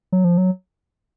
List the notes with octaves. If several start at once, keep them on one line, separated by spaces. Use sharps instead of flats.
F#3
F3
F#3